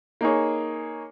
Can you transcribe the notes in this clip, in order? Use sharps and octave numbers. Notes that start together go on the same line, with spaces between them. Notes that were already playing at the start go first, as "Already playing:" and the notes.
A#3 D#4 G#4 C#5